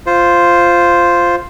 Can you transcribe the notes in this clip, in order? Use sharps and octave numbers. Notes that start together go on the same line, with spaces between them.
F4 C5